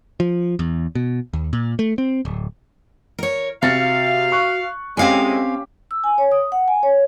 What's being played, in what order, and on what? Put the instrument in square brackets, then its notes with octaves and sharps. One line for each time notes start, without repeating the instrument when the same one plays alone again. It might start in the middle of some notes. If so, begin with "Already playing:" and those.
[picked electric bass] F3
E2
B2
D#2
A#2
A3
C4
D1
[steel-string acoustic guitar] A#4 C#5
[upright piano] C3 A6 [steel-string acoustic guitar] F#4 [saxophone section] F5
[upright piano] C#6 F#6
[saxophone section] A2 C3 G#3 [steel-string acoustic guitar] C4 F5 G#5 [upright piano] C#4 G4
[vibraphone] E6
G#5
C#5
D#6
F#5
G#5
C#5